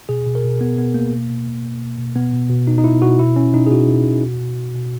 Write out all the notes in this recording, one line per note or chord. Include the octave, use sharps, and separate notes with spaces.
B2 G#4
B2
A#4
B2
B2 B3
B2 B3
B2 A#3
B2
B2
B2
B2
B2
B2
B2 B3
B2
B2
B2 D#4
D#4
B2 E4
B2 F#4
B2 E4
B2 C#4
B2 D#4
G#4
B2 F#4
B2
B2
B2
B2
B2
B2